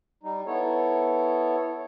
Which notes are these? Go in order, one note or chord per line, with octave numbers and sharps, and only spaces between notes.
G3 D#4
B3 E4 A4 C#5